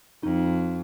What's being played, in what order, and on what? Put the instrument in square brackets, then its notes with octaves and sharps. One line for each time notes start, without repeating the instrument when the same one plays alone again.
[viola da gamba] F2 [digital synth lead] D#4